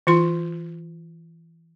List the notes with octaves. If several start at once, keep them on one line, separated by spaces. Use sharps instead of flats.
E3 F4 C6